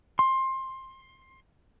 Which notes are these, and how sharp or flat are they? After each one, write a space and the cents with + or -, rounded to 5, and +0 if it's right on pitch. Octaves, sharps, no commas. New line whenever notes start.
C6 +20